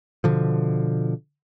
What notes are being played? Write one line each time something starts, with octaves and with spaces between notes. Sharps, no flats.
B2 D3 F3